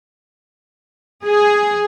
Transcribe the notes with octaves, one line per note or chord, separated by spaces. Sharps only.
G#4